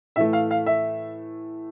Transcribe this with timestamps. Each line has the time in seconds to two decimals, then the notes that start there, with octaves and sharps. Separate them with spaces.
0.16 A2 E3 A3 E5
0.33 F5
0.51 F5
0.66 E5